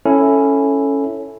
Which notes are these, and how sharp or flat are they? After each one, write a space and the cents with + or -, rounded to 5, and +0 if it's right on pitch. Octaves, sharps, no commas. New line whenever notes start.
C#4 +0 E4 +0 A4 +0